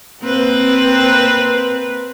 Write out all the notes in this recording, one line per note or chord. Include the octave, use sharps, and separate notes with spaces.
A#3 C4 B4